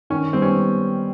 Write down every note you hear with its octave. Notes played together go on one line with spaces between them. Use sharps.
D#3 C#4
G3 B3 C4
C#4